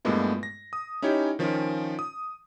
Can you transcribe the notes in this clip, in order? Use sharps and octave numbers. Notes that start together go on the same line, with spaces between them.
G2 A#2 G#3 A3 B3 E4
A#6
D#6
C#4 D#4 E4 G4 C#5
D#3 F3 C#4
D#6